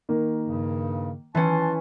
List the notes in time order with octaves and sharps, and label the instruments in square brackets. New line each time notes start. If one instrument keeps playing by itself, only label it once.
[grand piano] D#3 A#3
[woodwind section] G2 C#3
[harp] E3 C#4 [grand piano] B4 [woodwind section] A5 C6